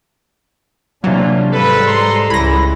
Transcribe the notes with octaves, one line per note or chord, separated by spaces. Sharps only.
C3 E3 F#3 A3 A#3 C#4 D4 F4
G#2 G3 A4 B4
A#5 C6
C#2 E3 E4 B5 A#6